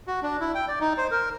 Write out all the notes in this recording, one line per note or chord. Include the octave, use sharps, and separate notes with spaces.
F#4
D4
E4
G5
D5
D#4
C5
A#4